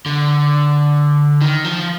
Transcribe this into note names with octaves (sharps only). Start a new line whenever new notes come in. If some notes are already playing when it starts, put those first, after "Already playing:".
D3
D#3
F3